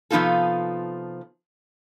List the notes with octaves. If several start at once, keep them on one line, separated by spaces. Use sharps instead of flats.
C3 F3 B3 D#4 F4 A4